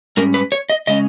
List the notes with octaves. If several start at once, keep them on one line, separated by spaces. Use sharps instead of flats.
G#2 G3 C#4 A#4
B4
C#5
D#5
C#3 G#3 C#4 D#5